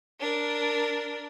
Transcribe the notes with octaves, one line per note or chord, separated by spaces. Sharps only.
D4 A#4